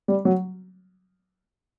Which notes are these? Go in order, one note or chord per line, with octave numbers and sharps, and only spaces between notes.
G3
F#3